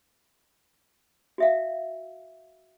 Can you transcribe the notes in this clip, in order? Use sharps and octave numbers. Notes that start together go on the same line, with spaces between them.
F#4 E5 F5